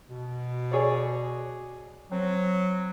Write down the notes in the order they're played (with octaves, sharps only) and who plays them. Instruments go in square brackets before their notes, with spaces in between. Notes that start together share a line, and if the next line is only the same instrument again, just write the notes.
[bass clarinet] B2
[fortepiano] G#4 C#5 D5
[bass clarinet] F#3 [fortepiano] C4